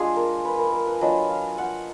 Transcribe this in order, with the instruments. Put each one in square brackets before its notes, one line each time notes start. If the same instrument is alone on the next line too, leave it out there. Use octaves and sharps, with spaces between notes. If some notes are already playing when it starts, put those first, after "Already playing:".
Already playing: [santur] G#3 D4 F4 G#4
A#4
B4
A#4
A#4
B4
F#3 D4 F4 D#5
F5
F#5